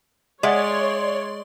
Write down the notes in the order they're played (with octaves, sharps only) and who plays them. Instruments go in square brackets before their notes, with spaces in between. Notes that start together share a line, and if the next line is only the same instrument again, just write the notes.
[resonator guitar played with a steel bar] G#3 [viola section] C#5 [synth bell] D5 C6 [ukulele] E5 F#5